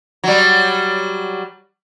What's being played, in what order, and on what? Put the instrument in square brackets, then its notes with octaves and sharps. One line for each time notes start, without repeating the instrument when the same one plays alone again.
[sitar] F#3 G3